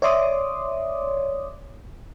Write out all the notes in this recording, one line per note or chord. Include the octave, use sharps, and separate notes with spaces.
C#5 D5 E5 C6 D6 D#6